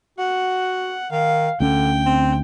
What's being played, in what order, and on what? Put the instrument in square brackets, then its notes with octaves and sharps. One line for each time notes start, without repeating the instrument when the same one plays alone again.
[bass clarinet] F#4 [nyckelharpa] F#5
[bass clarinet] D#3 [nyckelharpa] F5
[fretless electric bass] D2 C#4 [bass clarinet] D3 [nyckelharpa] G5
[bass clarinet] C4